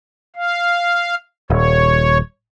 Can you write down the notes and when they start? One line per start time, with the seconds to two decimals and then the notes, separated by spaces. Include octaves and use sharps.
0.36 F5
1.50 D#1 C#5